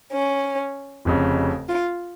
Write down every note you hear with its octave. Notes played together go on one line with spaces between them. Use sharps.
C#4
F1 F2 C#3
F4